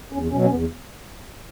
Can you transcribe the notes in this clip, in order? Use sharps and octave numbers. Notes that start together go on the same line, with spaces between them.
E2 C#4
B2 F#3 C#4
C#4
E2 B3